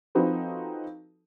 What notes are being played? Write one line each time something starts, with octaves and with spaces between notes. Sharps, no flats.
F3 C4 D#4 F#4 A4 B4